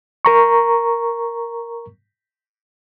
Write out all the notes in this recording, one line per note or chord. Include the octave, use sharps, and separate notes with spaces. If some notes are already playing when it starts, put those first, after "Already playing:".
A#4 A#5 C#6